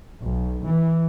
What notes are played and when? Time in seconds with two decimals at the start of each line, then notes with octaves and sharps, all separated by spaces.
0.22 B1
0.65 E3